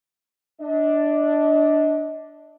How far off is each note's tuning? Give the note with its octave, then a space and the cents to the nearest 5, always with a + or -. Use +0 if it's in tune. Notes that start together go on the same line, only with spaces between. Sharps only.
D4 +0 D#5 +35